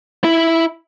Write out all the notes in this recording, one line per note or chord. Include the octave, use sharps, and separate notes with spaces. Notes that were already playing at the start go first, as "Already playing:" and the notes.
E4